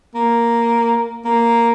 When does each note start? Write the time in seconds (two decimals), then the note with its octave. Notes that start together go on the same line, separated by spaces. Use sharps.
0.15 A#3
1.25 A#3